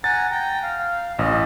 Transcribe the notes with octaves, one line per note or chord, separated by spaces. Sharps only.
F#5 G#5 A#5 A6
G5 A#5
F5
A1 D#5